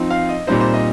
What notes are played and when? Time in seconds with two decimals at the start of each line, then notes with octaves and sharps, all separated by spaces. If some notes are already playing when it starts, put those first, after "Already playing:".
Already playing: F3 C4 D#4
0.10 F5
0.29 D#5
0.47 A#2 G3 C4 D#4 C5
0.60 C5
0.74 D#5